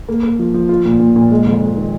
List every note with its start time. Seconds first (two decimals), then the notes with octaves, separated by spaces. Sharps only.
0.08 A#3
0.23 A#3
0.39 F3
0.54 F3
0.69 F4
0.85 A#2
1.00 A#2
1.16 A#2
1.31 G#3
1.47 F2
1.62 F2
1.77 D#3